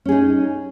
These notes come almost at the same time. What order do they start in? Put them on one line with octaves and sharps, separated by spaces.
C#4 G#4 D#4